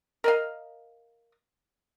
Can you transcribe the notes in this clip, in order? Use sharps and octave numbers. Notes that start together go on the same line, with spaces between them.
A#4 D#5 F5